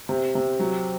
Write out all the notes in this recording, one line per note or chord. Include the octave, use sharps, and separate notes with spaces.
C3
C3
F#3